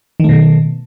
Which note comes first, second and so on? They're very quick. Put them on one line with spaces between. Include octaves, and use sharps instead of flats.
D#3 A3 B2